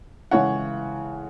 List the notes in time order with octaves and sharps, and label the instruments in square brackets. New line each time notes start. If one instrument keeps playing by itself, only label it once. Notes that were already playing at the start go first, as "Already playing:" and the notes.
[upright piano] C#3 E3 G#3 C#5 F#5